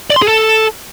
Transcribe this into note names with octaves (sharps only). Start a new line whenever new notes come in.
D5
C6
G#4
A4